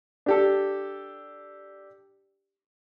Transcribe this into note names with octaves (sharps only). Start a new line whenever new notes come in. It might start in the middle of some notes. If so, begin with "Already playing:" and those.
D4 G4 A4